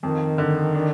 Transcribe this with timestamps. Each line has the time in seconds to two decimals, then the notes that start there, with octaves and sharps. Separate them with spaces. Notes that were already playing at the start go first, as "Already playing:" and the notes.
0.03 F2 D#3
0.38 D3
0.74 D4